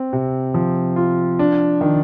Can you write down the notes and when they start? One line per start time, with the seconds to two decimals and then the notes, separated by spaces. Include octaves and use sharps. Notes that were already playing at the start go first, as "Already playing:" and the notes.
Already playing: C4
0.13 C3
0.54 F3
0.96 F4
1.39 D4
1.81 D#3